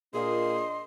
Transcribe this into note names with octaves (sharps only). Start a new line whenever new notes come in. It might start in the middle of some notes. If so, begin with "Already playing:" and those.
A#2 D4 G#4 D#5 C6